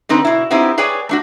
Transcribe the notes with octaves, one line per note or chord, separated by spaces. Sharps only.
D3 C4 D#4 B4
B2 E4
B3 C4 D#4 E4 G4
G#4 B4 C#5 D5 G5 G#5
A3 D4 F#4